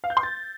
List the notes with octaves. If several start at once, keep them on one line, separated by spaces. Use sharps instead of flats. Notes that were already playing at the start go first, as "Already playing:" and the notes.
F5
G6
C6
A6